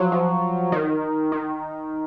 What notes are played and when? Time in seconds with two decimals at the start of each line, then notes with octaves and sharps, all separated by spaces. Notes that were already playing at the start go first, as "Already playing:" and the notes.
Already playing: F3 F#3
0.12 F3
0.72 D#3
1.32 D#3